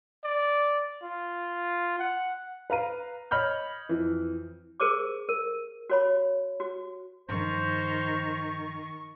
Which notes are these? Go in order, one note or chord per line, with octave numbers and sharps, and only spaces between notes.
D5
F4
F#5
B4 F5 A#5 D#7
C#5 D#5 B5 F6 G6
F2 E3
G#4 A#4 C5 C#6 D6
A#4
F#4 C#5 B5
F#4
G2 D#3 F3 C5 C#6